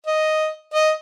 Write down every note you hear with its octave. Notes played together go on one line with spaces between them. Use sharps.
D#5
D#5